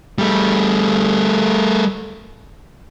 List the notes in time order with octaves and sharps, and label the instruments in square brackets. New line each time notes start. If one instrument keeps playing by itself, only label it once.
[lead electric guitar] G3 A3